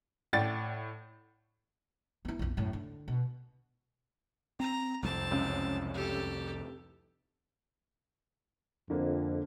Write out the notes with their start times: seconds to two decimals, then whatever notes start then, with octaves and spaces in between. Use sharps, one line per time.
0.33 A2 D5 F#5 G5 A6
2.25 B3 E4
2.39 A#1 F2
2.57 F#2 A2
2.73 D3
3.08 B2
4.60 C4 A#5
5.03 C2 F2 C4 A5
5.31 C#2 F#2
5.94 G4 A4
8.90 F2 D3 A#3